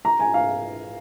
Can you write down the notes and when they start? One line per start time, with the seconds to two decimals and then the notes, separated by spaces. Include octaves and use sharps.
0.05 A#5
0.19 G#5
0.34 F5